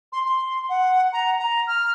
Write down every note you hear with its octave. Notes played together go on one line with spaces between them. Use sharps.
C6
C6
F#5
A#5
A#5
F6